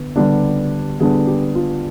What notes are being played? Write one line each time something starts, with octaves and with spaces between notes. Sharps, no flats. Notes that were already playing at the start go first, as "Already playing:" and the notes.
Already playing: D3 B3
D3 G3 B3 D4
D3 G3 B3 D4 G#4
G4
F4